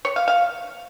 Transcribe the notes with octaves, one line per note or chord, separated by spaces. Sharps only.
C#5
F5
F5